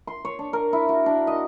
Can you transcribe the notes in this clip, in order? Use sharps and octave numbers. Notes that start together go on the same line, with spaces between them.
C6
C#5
D4
A#4
E4
F#4
D4
D#5